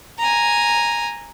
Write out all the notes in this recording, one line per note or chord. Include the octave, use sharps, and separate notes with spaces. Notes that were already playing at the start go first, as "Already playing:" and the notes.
G#5 A#5